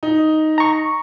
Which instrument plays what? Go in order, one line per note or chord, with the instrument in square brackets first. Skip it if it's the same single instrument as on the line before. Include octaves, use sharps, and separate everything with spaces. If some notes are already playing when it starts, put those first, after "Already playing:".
[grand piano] D#4
[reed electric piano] A#5 C#6